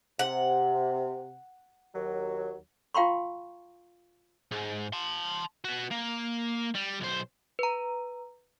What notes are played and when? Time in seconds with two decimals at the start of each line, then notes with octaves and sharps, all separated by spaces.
0.19 C3 F#5
1.94 D#2 F#3
2.95 F4 F5 G5 A#5 C6 C#6
4.51 G#2
4.93 A5 C6
5.64 B3 F#4
5.91 A#3
6.75 G3
7.01 B1 C5
7.59 B4 A#5